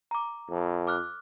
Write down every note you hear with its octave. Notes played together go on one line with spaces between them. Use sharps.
A#5 D6
F2
D6 F6 F#6